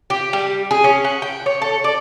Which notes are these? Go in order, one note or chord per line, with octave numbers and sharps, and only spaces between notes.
G4
G3
G#4
C#4
F#5
G5
C#5
A4
D5